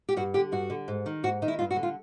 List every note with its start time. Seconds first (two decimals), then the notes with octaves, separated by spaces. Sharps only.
0.09 G4
0.17 G2 F#4
0.34 D3 G4
0.52 G2 F#4
0.70 D3
0.88 G#2
1.06 D#3
1.24 G#2 F#4
1.42 D#3 D#4
1.48 E4
1.59 G2 F4
1.71 F#4
1.76 D3
1.83 F4